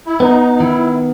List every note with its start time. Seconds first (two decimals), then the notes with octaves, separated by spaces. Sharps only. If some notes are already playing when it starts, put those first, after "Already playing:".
0.06 E4
0.20 B3 D#4
0.53 D#4
0.60 D#3 E4